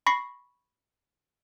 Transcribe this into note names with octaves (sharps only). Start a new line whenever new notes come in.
B5 C#6 A#6 C7